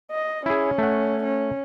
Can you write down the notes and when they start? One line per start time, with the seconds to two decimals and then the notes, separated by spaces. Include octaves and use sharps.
0.11 D#5
0.46 C#4 E4 G#4
0.78 A3 F#5
1.24 C#4